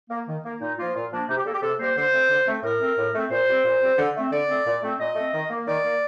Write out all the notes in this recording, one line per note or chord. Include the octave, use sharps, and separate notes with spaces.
A#3
D#3
A#3
A#2 D#4
F3 A#3 F4
A#2 F4
F3 A#3 D4
C3 D#4
G4
G3 A#3 A4
G4
C3 A4
G3 A#3 C5
D3 C5
A3 C4
D3
A3 C4
A2 A#4
A3 C4
A2
A3 C4
A#2 C5
G3 C4
A#2
G3 C4
D3
A3 C4
D3 D5
A3 C4
A#2
A3 C4
A#2 D#5
A3 C4
D#3
A#3
D#3 D5
A#3